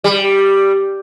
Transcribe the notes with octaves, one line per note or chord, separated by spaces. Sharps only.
G3